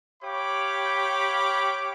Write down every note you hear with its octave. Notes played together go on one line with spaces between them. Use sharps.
G4 C#5 F5 G5 B5 D6